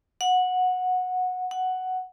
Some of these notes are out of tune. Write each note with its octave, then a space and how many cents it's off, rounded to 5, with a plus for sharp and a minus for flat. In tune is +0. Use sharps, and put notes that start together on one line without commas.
F#5 -15
F#5 +5